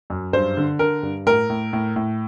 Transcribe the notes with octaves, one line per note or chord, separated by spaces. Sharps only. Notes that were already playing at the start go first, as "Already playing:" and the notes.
F#2
G2 C5
D3
D3 A#4
G2
A2 A#4
A2
A2
A2